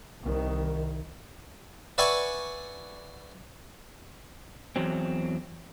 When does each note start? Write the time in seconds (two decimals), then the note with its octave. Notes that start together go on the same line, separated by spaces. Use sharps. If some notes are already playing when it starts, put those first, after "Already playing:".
0.23 C2 D#3
1.98 B4 D5 E5 F#5 G#5 C#6
4.76 E2 F#3 C4